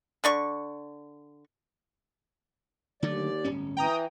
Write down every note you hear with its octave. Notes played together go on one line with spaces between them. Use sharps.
D3 D5 C#6
D#2 D3 F#3 A3 D5
D1 G1 C#4
E3 G5 A#5 D#6